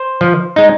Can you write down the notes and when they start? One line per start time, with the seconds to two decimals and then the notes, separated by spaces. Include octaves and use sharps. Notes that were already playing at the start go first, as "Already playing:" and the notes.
Already playing: C5
0.21 F3
0.56 G#3 D#4